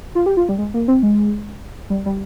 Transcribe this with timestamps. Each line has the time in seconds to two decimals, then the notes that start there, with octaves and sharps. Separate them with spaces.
0.15 F4
0.26 G4
0.37 F4
0.49 G3
0.58 G#3
0.74 A#3
0.88 C4
1.03 G#3
1.90 G3
2.06 G3